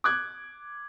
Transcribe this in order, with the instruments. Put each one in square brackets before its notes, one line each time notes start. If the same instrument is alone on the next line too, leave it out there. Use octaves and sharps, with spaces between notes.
[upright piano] D6 F#6 G#6